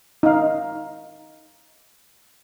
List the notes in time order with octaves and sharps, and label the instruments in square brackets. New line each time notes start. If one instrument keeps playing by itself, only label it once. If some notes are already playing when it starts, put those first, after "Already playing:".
[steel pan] D#4 F5